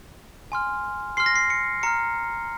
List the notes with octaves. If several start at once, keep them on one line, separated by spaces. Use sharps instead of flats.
G#5 C6 F6
C6 F6 C7
A#6
C7
C#7
A#5 F6 C#7